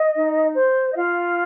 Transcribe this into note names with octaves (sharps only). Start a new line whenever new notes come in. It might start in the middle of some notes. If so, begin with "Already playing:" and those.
Already playing: D#5
D#4
C5
D#5
F4 F5